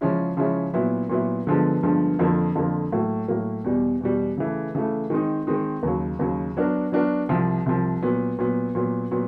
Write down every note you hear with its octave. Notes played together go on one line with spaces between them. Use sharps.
C#3 F3 G#3 C#4 E4
C#3 F3 G#3 C#4 E4
A#2 F#3 B3 E4
A#2 F#3 B3 E4
G2 D3 F3 G#3 B3
G2 D3 F3 G#3 B3
F2 D3 F3 A#3
F2 D3 F3 A#3
A2 F#3 A#3
A2 F#3 A#3
E2 B2 G3
E2 B2 G3
C#3 E3 A3
C#3 E3 A3
D#3 G#3 C4 D#4
D#3 G#3 C4 D#4
D#2 C#3 F#3
D#2 C#3 F#3
F#3 B3 D4 F#4 A#4
F#3 B3 D4 F#4 A#4
C2 C3 F3
C2 C3 F3
A#2 F#3 B3
A#2 F#3 B3
A#2 F#3 B3
A#2 F#3 B3